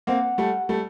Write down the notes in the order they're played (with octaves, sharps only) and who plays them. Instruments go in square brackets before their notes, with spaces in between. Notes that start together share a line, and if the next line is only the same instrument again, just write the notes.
[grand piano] A#3 C4 [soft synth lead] F#5
[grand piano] G3 A3
G3 A3